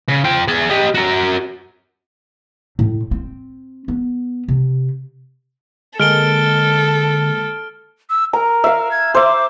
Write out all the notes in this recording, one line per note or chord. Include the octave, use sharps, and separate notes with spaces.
C#3
F4 G5
G#4 D5
G4 D#5
F#4 A#4
A2
C4
B3
C3
D3 G#3 A#3 A4 F6 D7 G7
E6
A#4 A#5
E5 F5
G#6
C5 E5 D6